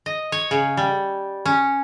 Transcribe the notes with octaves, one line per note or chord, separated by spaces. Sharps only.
D#5
C#5
C#3
G3
C#4